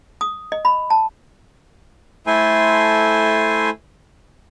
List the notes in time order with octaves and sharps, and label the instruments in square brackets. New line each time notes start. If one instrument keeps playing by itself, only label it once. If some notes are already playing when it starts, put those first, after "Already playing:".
[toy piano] D#6
D#5
B5
A5
[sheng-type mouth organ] A3 E4 A4 C5 G#5 C6